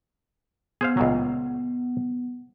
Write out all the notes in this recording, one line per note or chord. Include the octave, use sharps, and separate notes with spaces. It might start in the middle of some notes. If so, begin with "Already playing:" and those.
B3 G#4 C5 F5
C#2 A#2 F#3